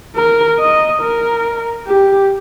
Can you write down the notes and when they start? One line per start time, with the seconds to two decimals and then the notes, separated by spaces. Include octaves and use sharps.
0.16 A#4
0.60 D#5
1.02 A#4
1.87 G4